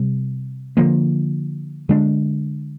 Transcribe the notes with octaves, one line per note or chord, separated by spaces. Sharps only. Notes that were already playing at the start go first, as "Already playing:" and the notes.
Already playing: C3 G3
D3 F3 A#3
D3 G#3 D4